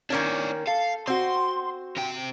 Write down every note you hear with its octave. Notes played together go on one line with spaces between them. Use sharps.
D#3 A#3 C#4 D4 C#5
A4 F5
C4 F#4 C6
C3 G5